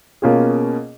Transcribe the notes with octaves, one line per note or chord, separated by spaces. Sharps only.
B2 A#3 C#4 F4 G#4